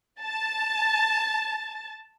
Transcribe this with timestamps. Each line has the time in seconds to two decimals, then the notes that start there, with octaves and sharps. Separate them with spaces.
0.22 A5 A6